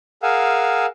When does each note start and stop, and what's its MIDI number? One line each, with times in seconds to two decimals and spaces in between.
0.23 0.86 68
0.23 0.86 70
0.23 0.86 77
0.23 0.86 78
0.23 0.86 80
0.23 0.86 88